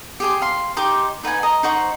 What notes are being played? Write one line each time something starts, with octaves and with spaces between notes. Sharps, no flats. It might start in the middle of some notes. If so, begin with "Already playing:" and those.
G4 G#4 C6
F5 C6
D#4 G4 C6 D6
D#4 B4 F#5 G#5
D#5 A#5
D#4 C5 F#5 C#6